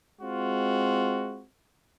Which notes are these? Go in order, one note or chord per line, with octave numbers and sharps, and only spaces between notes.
G#3 C4 F4 F#4